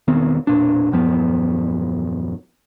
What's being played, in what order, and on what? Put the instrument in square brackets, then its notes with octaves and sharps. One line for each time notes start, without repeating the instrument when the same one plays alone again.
[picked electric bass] E1 D#3 B3 C4
E1 A#2 D4
D#1 F#2 F3 B3